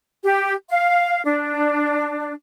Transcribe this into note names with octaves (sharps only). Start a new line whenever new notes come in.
G4
F5
D4